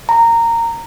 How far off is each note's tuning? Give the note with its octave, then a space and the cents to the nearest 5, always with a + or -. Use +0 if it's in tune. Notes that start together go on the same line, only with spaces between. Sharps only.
A#5 -15